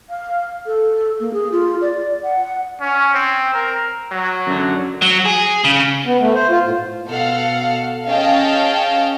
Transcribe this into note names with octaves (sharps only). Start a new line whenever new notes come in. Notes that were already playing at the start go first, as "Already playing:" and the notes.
F5
A4
A#3
G#4
F4
D5
F#5
C#4
C4
A#4
F#3
F#2 D3
F#3
G#4
C#3
B3
A3
C5
F4
A2
B2 A4 F5 F#5
C#4 G#4 D#5 F5 G5 A5